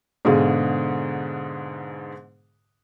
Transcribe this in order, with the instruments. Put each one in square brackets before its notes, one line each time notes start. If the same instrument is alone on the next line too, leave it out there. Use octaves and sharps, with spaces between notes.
[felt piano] G#2 B2 D3 G#4 F5